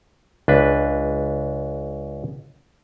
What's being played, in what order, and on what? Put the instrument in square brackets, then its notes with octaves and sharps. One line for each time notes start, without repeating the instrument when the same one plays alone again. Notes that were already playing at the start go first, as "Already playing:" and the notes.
[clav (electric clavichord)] C#2 D4 B4